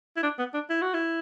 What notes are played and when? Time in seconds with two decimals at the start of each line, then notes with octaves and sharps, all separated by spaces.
0.17 E4
0.23 D4
0.39 B3
0.54 D4
0.70 E4
0.82 F#4
0.94 E4